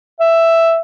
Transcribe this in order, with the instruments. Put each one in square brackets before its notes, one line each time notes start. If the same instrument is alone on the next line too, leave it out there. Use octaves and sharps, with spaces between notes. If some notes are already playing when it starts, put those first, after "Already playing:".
[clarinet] E5